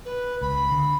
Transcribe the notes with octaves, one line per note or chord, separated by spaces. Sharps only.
B4
C#2 B5
D3